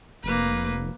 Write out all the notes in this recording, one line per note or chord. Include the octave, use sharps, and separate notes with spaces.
F1 A#3 B4